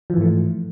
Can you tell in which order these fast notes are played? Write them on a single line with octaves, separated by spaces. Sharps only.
F3 E3 G#2 A3